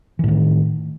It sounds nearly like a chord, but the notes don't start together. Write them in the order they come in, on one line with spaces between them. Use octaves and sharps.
E3 A2 D#3